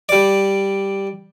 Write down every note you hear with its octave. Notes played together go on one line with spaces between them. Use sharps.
G3 D5